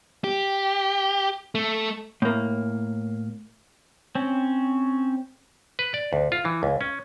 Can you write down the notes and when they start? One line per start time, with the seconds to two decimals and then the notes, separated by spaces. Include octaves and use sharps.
0.24 G4
1.55 A3
2.22 A2 A#3
4.15 C4 C#4
5.79 B4
5.94 D5
6.13 D2
6.32 F4
6.45 E3
6.63 C#2
6.81 C#4